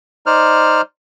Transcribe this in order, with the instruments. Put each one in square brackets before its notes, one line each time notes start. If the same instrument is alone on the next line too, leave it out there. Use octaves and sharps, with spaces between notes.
[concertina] D#4 C5 D5 F6